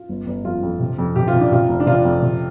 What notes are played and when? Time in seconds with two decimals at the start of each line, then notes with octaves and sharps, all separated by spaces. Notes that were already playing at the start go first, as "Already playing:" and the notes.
Already playing: F4
0.09 G1
0.26 G1
0.45 F2 F4
0.63 F2
0.80 C3
0.98 F2
1.16 C3 G4
1.28 F4
1.33 C3
1.40 D4
1.52 C3 F4
1.69 F1
1.80 D4
1.87 C3 F4
2.05 F2
2.23 C3